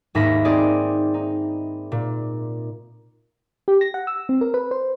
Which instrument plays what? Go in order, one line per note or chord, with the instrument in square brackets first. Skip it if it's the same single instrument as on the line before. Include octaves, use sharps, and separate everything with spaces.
[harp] D#2 G#2 D#4 E5 B5 A#6
C4 D#4 G#4 D5
D#4
A#2
[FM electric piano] G4
A#6
F#5
E6
C4
A#4
B4
C5